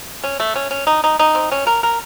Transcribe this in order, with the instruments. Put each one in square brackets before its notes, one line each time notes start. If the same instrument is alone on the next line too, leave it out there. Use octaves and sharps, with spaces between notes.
[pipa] C#4
A3
C#4
C#4
D#4
D#4
D#4
C4
C#4
A#4
A#4